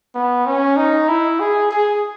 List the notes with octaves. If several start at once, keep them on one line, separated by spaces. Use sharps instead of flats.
B3
C#4
D#4
E4
G#4
G#4